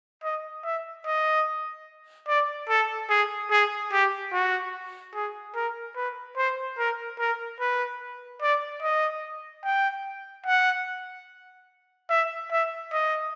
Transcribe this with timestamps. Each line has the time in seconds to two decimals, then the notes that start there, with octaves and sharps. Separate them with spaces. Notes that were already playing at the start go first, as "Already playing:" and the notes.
0.24 D#5
0.65 E5
1.05 D#5
2.28 D5
2.69 A4
3.10 G#4
3.51 G#4
3.92 G4
4.33 F#4
5.15 G#4
5.55 A#4
5.96 B4
6.37 C5
6.78 A#4
7.19 A#4
7.60 B4
8.42 D5
8.83 D#5
9.64 G5
10.46 F#5
12.10 E5
12.51 E5
12.92 D#5